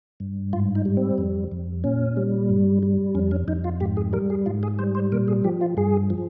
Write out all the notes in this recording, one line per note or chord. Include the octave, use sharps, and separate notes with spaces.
G2
G#2 F4
D#4
G3
C4
F2
F2
A#2 C#4
G3
G2
G3
F2 C#4
C#4
F2 D#4
F4
G#2 G4
G#4
G3 A#4
G#4
G#2 F4
G#4
G3 C5
C5
A#2 A#4
G#4
F3 G4
F4
G2 G#4
F3